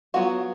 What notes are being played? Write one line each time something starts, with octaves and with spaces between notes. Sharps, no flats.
F#3 B3 F4 F#4